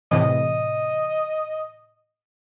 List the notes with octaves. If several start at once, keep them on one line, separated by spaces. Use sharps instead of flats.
A2 C3 E3 D#5